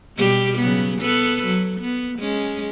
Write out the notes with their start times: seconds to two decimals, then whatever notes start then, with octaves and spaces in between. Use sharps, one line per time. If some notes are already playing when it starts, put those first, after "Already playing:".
0.17 B2 G3 G4
0.59 C#3 F#3 B3
1.01 B3 A4 B4
1.46 F#3
1.80 B3
2.19 G#3 C#4